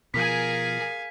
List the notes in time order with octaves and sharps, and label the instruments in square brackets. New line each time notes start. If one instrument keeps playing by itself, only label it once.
[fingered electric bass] B2 F3 [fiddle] G#4 A#4 [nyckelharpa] F5 G#5 [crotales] B6